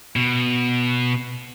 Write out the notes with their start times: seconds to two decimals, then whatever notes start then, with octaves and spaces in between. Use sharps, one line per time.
0.16 B2